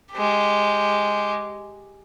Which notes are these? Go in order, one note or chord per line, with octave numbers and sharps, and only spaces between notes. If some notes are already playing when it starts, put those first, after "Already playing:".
G#3 G4